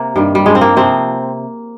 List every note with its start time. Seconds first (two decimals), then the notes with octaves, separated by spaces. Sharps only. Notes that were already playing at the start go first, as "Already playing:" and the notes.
Already playing: C3 A#3
0.16 G2 D#3 G3
0.35 G3
0.46 G2 F3 G#3
0.55 C4
0.61 A#3
0.76 C3 F3 C4